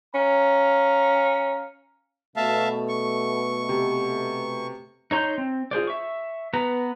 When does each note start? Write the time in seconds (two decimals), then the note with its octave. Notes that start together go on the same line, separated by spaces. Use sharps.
0.15 C#4 F5 A#5
2.36 B2 A3 E5 F5 A5
2.88 C#6
3.69 C3
5.11 D#4 C#5 A#5 C6 G6
5.38 C4
5.71 F4 G#4 C5 D5
5.87 E5 C#6
6.54 B3 B4 A#5